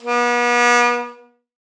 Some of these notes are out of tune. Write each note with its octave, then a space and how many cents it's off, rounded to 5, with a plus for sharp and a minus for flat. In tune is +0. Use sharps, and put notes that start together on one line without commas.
B3 -40